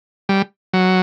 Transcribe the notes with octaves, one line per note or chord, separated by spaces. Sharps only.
G3
F#3